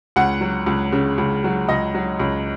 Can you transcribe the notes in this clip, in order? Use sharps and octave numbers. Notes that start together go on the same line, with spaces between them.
C#2 F#5
F#3
C#2
C#3
C#2
F#3
C#2 D#5
F#3
C#2